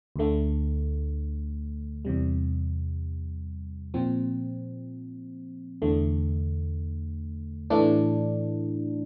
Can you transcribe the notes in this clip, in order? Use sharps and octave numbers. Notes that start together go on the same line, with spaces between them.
D2 D3 A3
E2 C3 G3
A#2 F3 C4
E2 D3 A3
A2 E3 A3 D4